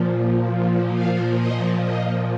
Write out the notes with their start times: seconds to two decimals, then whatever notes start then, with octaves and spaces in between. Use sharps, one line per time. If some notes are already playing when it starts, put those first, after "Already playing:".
Already playing: A#2 F3
0.91 F5
1.38 D#5
1.84 D#5